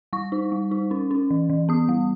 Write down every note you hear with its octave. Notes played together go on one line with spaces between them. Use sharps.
G3 C#6
D#4
G3
D#4
C#4
C#4
E3
E3
B3 D#6
G3